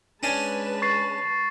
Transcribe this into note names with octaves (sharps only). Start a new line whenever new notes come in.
G#3 C#4 D4 B4 G#5 A5
C#6 A6 C7